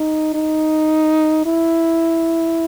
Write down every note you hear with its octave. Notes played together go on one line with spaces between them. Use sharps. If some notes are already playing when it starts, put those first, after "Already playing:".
Already playing: D#4
D#4
E4